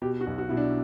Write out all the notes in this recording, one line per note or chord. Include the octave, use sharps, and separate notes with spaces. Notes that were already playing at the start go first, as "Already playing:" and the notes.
B2 G4
F#4
B1
F#4
B2 E4
D4